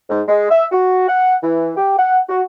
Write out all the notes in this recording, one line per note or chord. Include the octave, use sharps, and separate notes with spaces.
G#2
G#3
E5
F#4
F#5
E3
G4
F#5
F#4